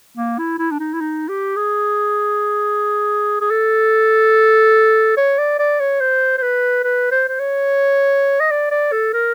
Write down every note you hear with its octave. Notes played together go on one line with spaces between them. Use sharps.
A#3
E4
E4
D4
D#4
E4
D#4
G4
G#4
G#4
A4
C#5
D5
D5
C#5
C5
C5
B4
B4
C5
C5
C#5
D#5
D5
D5
A4
A#4